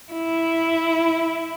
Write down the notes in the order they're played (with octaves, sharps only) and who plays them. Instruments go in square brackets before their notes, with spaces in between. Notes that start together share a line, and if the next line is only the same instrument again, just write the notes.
[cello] E4